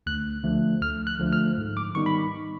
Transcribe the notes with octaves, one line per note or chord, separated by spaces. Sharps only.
D2 F#6
D3 F3 A3
D2 F6
F#6
D3 F3 A3
F6
G#2
D6
D#3 G3 B3 D#4 C#6
B5